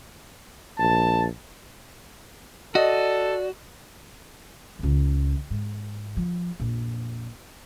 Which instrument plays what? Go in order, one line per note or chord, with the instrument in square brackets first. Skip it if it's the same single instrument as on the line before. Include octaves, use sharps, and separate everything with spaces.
[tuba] A#1 [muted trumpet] A5
[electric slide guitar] F#4 [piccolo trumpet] A4 [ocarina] D5 [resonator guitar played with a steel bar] D#5
[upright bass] C#2 D#3
G#2
F3
A#1 F2